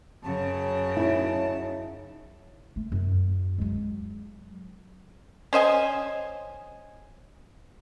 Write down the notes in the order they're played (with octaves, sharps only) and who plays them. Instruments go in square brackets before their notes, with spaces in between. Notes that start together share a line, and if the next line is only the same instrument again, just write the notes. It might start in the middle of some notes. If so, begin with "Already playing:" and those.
[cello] F#2 C#3 [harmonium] F#3 A5
[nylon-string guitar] D#4 E4
[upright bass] A3
F#2
F#3 G#3
[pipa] C#4 C5 D#5 G#5